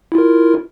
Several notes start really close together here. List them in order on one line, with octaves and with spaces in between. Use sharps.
E4 F4 A#4